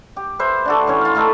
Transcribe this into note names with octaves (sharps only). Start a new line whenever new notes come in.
G4
B4 C5 E5
D4 F#4 A4
E3 C#4 C#5
F4 F5
E3 A3 D#4 A4